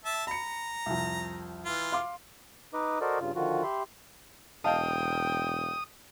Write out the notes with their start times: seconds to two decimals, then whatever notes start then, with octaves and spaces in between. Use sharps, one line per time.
0.05 E5 A5
0.27 A#5 B5 C#7
0.86 C2 F2
1.66 E3 F4
1.92 F5 C6 D6
2.74 D#4 B4 D#5 D6
3.01 F#4 A4 A#4 C5 D5 D#5
3.20 G2 C#3 F4
3.35 D3 D#3 F3 F4 F#4
3.63 G4 E5 B5 C6
4.64 E1 D#5 F5 G5 A5 D#6